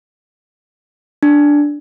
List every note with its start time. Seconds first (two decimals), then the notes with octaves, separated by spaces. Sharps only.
1.23 D4